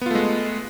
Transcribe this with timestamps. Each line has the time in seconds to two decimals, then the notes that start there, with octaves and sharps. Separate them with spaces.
0.01 B3
0.06 F4
0.11 A3
0.15 G#3